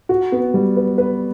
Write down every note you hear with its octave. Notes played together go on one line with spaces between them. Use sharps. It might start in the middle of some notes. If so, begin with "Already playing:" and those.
F#4
B3
G3
B4
B4